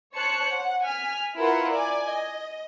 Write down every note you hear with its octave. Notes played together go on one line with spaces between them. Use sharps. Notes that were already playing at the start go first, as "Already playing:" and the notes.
C5 C#5 A5 F#6 C#7
F#5
G#5 F6 B6
E4 F4 A#4 B4 F#5
D5 G#5
D#5